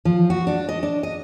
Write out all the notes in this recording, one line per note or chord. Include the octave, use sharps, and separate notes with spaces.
F3
F#4
D4
D#5
D4
D#5